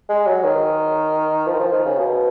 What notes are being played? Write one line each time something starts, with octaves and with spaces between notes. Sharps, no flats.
G#3
F#3
D#3
F3
D#3
F3
D#3
C#3
B2